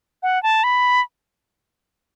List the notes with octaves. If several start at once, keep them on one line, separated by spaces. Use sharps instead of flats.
F#5
A5
B5